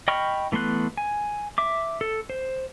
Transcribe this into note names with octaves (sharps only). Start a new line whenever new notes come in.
D#5 G5 B5 C#6 F6
E3 A3 B3 C6 F#6
G#5
E5 D6
A4
C5